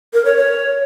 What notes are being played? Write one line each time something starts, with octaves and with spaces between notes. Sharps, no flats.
A#4
C#5
C#5